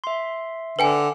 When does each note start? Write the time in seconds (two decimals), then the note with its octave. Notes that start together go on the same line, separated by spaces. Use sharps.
0.04 E5 C6
0.79 D3 B4 G5 G#5